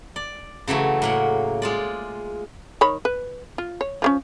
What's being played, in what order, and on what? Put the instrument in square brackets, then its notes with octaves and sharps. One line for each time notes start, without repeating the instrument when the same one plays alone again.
[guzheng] D5
C#3 E3 F#3 A3
A2 A#3 F#5
G#3 F4 D5
[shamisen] D#3 C#5 B5
B4
F4
C#5
F3 A3 C#4